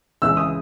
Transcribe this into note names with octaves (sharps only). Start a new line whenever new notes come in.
C#2 C#3 E3 E6
D#6